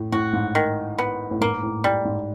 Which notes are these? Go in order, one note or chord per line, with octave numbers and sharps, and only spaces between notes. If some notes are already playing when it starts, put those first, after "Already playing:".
Already playing: A2
A2 F#4
G#2
D#3
B3
A2
G#2 A#3
A2
A2 G3
G#2